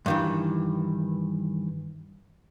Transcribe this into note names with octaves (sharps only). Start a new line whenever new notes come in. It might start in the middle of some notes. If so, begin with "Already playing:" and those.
G2 D#3 E3